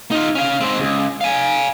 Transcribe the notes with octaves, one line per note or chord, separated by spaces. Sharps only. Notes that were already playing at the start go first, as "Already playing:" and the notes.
D#4 F4
C#4 F5
G#3 C4
C#2
F5 G#5